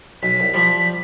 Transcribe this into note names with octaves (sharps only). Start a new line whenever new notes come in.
B1 B6
C2
F3 G3